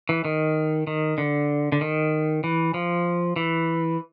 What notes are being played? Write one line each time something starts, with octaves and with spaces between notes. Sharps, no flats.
E3
D#3
D#3
D3
D3
D#3
E3
F3
E3